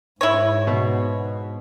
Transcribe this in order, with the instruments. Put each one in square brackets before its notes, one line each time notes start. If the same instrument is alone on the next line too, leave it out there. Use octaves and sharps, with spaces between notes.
[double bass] G#2 [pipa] E4 C#5
[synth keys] B2